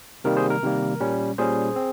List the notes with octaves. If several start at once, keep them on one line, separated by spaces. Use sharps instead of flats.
C3 D#3 G3 A#3 A#4
G#4 C5
A#4
C3 D#3 G3 A#3
A#2 G3 C#4
A#2 G3 C#4 G#4 C5
C4